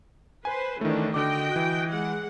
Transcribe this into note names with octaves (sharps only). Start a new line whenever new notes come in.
B4 C5 G#5
D#3 E3 A3 C#4 D4
D3 F#4 D#5 G5 D6
E3 F#6
G#3 F#5